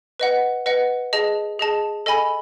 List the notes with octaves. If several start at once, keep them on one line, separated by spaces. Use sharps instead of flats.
B4 D#5 F#5
B4 D#5 F#5
G#4 D#5 A5
G#4 D#5 A5
A4 D#5 G#5 B5